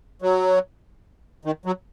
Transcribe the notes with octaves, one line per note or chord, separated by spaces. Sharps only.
F#3
D#3
F#3